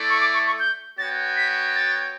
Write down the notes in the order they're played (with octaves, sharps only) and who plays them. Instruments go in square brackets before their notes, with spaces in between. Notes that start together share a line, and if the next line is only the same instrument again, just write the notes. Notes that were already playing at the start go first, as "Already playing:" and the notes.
Already playing: [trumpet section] A3 E4 A4 D5
[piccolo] C#6
D6
C#6
C#6
G6
[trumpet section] B3 F#4 C#5 G5 [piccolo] A6
[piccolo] B6
A6